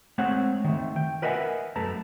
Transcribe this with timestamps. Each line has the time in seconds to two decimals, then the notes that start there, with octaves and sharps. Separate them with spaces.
0.18 G#3 A3 C4 C#5 F#5
0.64 D#3 A3
0.96 G5
1.22 A#4 B4 D#5 E5 F#5 G#5
1.76 F#2 A3 B4 A5 A#5